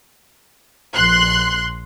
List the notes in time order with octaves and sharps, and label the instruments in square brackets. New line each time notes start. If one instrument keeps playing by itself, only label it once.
[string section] A#1 C6 F#6